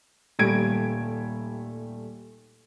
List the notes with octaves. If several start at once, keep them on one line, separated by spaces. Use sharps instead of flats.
D#1 G3 A3 G#6 D7